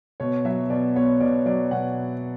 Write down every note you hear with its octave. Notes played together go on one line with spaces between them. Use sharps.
B2 C#5
F#3 E5
B2 D5
B3 C#5
B2 D5
F#3 D5
B2 F#5